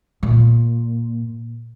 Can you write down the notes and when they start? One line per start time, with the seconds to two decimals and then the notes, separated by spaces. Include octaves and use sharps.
0.23 A#2